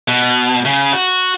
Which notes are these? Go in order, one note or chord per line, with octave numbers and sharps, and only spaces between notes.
B2
C#3
F#4